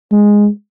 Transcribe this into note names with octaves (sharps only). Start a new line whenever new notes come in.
G#3